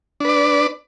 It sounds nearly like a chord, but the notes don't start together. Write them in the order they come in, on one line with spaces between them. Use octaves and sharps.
D4 B4 D5